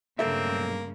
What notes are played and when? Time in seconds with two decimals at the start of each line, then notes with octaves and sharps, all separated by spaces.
0.19 B1 G2 C#3 A3 A#3 C4 A4 E5